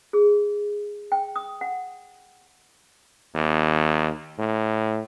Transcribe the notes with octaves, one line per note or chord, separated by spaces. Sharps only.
G#4
G5
D#6
F#5
D#2
A2